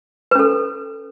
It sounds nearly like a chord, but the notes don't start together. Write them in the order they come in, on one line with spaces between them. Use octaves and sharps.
B4 C#4 A4